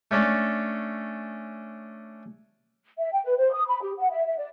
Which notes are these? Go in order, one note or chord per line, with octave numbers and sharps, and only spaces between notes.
A3 C#4 D4 A4
E5
G5
B4
C5
D#6
B5
G4
F#5
E5
E5
D5